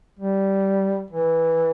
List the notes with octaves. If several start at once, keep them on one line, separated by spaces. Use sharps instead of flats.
G3
E3